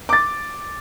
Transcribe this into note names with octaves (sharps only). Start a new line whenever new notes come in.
D6 A6